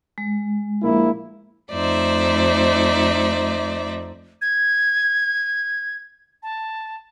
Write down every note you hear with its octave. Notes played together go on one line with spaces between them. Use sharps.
G#3
A#1 A#3 E4
F2 A3 D#4 C5 D5 E5
G#6
A5